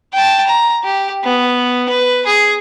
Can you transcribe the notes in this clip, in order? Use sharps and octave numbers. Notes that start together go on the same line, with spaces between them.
G5 A5
A#5
G4
B3
B4
G#4